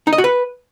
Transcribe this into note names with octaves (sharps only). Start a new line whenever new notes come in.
D#4
D#5
F#4
B4